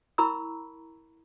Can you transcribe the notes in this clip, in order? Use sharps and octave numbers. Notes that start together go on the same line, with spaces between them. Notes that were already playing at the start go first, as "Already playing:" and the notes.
E4 A#4 A#5 B5 C#6 E6